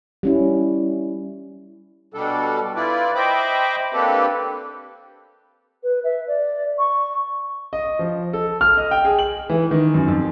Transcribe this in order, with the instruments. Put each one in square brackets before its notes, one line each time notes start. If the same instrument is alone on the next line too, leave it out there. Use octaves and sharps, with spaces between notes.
[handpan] G3 C#4 E4
[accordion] B2 G3 D4 A4
E4 F4 B4 D5
C5 D#5 E5 G5 B5 D6
A#3 C4 D4 G4 A4 B4
[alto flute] B4
E5
D5
C#6
[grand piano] D#5
F3
A4
F6
D#5
G5
G#4
F#7
E3
D#3
F#2
F2